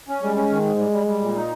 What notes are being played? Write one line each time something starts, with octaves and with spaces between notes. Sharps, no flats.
C#4
G3 G#3
C#4
D#3
G#2
G3
G3
G3
A#2
D#4